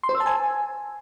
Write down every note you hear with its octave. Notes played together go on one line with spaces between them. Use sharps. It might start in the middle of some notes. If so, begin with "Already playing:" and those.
C6
C5
E6
A5
G#5